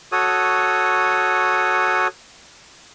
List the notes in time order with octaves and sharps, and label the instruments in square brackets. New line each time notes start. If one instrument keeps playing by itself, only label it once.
[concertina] F#4 A4 C#5 D#6